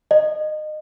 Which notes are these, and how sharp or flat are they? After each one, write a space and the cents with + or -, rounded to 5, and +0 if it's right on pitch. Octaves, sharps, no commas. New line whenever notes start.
D#5 -25